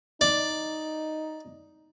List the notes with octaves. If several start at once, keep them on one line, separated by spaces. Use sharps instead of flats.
D#4 D5